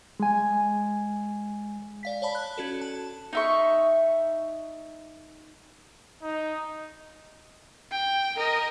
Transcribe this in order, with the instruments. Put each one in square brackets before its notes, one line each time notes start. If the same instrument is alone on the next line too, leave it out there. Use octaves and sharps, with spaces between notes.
[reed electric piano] G#3 G#5
[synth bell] D5 F5 B6
C#5 D5 A5 B5
F#6
C#4 F#4 A4
A5
[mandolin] D#4 E5 C#6
[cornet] D#4
[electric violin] G5
A#4 D#5